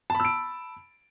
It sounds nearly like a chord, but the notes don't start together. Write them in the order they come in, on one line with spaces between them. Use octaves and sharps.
A5 B5 E6 D7